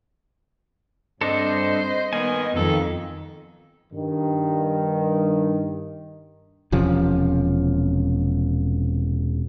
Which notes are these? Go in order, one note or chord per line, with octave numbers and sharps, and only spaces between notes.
G2 C4 D4 A4 C5 D#5
D#3 B3 G#5
F2 D#3 A4
G2 D#3
E1 C3 F3 C#4